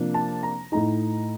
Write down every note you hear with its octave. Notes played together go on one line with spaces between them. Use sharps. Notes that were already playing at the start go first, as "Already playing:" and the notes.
Already playing: C3 F3 A#3 D4
A5
A#5
A2 A3 D#4 A#5